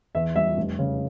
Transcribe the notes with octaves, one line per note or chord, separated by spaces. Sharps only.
E2 E5
G3 E5
F1
C#3